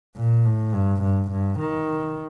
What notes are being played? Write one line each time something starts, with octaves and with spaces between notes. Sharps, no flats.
A#2
A2
G2
G2
G2
D#3